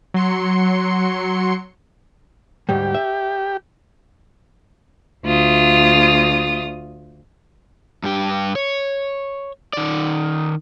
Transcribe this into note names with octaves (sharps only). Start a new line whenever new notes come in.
F#3 C6 C#7
D2 G#2 G3 G4
E5
D2 F4 D#6
G2 G4
C#5
D#3 D5